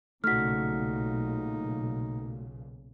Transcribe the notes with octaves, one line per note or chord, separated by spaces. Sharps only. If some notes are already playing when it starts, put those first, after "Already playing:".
B1 A#2 C#3 A3 D#4 F#4 F6 B6